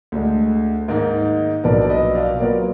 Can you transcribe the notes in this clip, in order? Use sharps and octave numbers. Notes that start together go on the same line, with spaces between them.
D2 D3 G#3
G#2 D#3 A#3 D#4
B1 A#2 F3 B3 D4 A#4 D5
D5
B4 D#5
D5 F5
A#2 F#3 B3 F4 A#4 D5